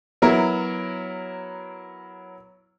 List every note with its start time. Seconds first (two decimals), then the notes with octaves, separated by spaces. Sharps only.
0.22 F#3 B3 E4 A#4